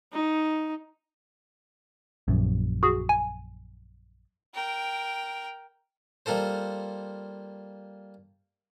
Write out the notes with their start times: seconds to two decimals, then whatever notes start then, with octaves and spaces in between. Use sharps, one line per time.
0.13 D#4
2.28 A#1 F#2
2.83 F#4 G#4
3.09 G#5
4.54 A#4 G5
6.26 G3 A#3 F4 A4 C5